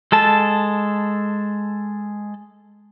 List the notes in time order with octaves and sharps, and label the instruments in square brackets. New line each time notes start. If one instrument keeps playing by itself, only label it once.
[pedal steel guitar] G#3 A4 A5